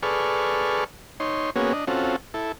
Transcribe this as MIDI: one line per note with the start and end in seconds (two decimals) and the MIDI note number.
0.03 0.84 68
0.03 0.84 69
0.03 0.84 71
0.03 0.84 74
0.03 0.84 85
0.03 0.84 89
1.20 1.50 63
1.20 1.50 73
1.20 1.50 84
1.56 1.73 58
1.56 1.73 59
1.56 1.73 61
1.56 1.73 66
1.56 1.73 68
1.56 1.73 73
1.73 1.85 62
1.73 1.85 75
1.87 2.16 60
1.87 2.16 61
1.87 2.16 65
1.87 2.16 66
1.87 2.16 69
2.34 2.52 64
2.34 2.52 69